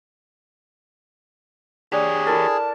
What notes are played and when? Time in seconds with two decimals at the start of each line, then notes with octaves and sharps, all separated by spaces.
1.92 D4 G4 G#4 C#5
2.27 E4 A4 A#4 A5